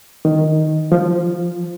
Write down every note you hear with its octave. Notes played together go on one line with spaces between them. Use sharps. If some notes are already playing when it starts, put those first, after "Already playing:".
D#3
F3